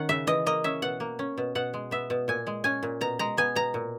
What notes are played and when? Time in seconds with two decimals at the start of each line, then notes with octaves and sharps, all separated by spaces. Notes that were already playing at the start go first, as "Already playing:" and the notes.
Already playing: D#3 C#4 F#5
0.09 C#3 E5
0.27 E3 D#5
0.46 A#3 D#5
0.64 C#4 E5
0.82 B2 F#5
1.00 A#3
1.19 C#4
1.38 B2
1.55 B2 F#5
1.74 G#3
1.91 B3 E5
2.10 B2
2.28 A#2 G#5
2.47 G#3
2.64 C#4 G#5
2.83 A#2
3.01 B2 A#5
3.19 G#3 A#5
3.37 B3 G#5
3.55 B2 A#5
3.74 A#2